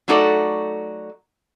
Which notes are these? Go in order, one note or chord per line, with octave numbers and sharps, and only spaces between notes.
F#3 A3 D#4 F#4 A4 D5